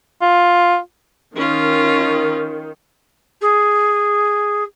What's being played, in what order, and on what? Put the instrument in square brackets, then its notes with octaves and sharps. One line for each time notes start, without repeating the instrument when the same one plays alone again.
[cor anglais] F4
[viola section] D#3 [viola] C#4 F4
[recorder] G#4